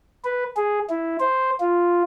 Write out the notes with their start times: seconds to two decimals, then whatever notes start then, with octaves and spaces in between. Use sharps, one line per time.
0.24 B4
0.57 G#4
0.90 E4
1.20 C5
1.60 F4